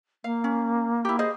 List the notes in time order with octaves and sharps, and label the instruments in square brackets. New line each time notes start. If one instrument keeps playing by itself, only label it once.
[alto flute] A#3 [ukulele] F5
[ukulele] C#4
E4 G4
G#4 C5 D#5